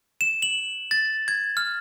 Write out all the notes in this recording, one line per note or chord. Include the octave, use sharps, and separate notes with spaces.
E7
F#7
A6
G#6
F6